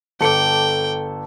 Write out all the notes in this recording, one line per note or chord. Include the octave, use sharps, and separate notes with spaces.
G1 A4 G5 D6 C#7